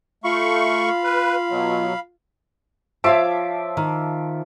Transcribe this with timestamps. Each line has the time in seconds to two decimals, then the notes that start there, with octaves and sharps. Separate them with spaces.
0.24 A3 F4 F5 B5 C#6
1.04 B4
1.50 B2 F#3
3.04 F3 C#5 E5 F5 A5 D6
3.77 D#3